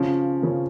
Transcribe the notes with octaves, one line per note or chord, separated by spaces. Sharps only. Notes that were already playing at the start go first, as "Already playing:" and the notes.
Already playing: C#3 F3 C#4
C#3 F3 C#4